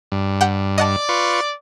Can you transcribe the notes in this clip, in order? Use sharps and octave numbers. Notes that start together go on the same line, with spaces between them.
G2
G4 F#5 G5
D5 D#5 F#5 A5
F4 B4 C#6